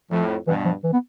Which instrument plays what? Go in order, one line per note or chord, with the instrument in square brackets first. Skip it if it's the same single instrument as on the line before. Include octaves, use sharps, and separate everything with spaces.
[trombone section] F2 A2 [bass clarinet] F3
[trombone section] G2 B2 [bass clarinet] E3
[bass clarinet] F3
E3
B3